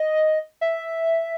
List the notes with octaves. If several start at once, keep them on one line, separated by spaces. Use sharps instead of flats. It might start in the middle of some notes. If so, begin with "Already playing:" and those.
Already playing: D#5
E5